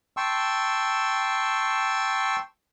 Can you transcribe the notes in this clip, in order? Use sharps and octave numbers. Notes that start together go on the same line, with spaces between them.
G5 A5 C6 C#6 E6